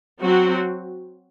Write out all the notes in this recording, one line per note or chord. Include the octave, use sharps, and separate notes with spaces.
F#3 C4 F#4